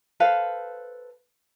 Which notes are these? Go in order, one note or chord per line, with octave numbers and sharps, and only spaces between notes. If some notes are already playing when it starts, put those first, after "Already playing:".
A4 B4 C5 F5